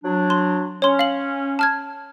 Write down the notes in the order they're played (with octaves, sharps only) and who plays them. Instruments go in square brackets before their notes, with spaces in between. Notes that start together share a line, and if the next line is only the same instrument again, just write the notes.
[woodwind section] F#3 D4
[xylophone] C6
[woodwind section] C#4 [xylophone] C#5 C6
[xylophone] F5 F#7
A5 F6 G#6